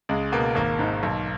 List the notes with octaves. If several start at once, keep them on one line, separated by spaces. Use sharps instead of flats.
C#2 G#3
B2 A#3
G#1 A#3
G#2 D#3
B1